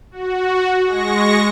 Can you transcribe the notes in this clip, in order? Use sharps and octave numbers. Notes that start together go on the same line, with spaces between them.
F#4
G#3 C#6 A#6